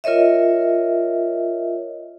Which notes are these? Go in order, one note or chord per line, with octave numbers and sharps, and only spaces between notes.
F4 A#4 C#5 D#5 E5